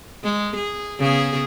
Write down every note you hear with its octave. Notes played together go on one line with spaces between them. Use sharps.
G#3
G#4
C#3 B3 G#4